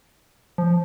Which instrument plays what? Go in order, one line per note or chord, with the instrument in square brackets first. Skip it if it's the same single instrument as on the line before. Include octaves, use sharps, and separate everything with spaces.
[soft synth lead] F3